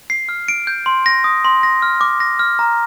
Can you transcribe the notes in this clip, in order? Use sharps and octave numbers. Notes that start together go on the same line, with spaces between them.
C7
F6
D7
G6
C6
A#6
D#6
C6
A#6
F6
D6
A#6
F6
A#5